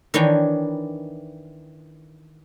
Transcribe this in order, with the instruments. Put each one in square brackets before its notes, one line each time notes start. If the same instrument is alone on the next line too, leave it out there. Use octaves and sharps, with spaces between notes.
[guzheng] D#3 E3 D4 C#5 G5